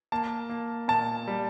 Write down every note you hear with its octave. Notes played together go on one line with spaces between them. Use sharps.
A#3 A5
A#3
A#2 A5
G3